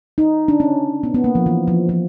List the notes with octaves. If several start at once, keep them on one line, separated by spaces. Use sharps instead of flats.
D#4
D4
C#4
B3
B3
A#3
F3
E3
F3
F3